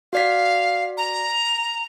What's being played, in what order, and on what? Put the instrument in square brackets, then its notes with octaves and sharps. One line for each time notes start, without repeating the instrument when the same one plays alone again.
[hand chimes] F#4 D5 B6 [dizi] F5
[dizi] A#5